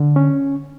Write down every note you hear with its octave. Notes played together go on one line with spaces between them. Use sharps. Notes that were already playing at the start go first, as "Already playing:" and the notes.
Already playing: D3
C#4